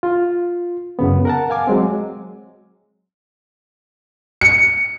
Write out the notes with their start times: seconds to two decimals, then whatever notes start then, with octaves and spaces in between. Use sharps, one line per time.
0.03 F4
0.99 F#2 C#3 B3
1.25 A#4 F#5 A5
1.50 F5 G#5 D6
1.67 F#3 G#3 C4
4.41 C#7